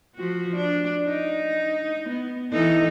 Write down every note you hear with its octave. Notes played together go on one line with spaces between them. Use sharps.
F3 F#4
D4
D#4
B3
E3 D#4 A4